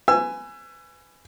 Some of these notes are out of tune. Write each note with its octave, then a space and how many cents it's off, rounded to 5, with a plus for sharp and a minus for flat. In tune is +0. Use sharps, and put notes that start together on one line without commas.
B4 +20 G#5 +0 E6 +30